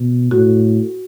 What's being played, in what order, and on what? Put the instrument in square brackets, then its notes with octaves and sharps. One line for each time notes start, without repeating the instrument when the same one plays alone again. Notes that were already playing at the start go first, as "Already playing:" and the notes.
Already playing: [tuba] B2
[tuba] A2 [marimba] F#4